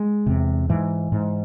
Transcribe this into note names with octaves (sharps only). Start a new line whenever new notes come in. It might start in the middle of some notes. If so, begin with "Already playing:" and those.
Already playing: G#3
E2 C3
G#2 E3
G#2